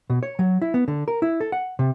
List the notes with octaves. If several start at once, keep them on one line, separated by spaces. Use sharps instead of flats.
B2
C#5
F#3
E4
B3
D3
A#4
E4
A4
F#5
C3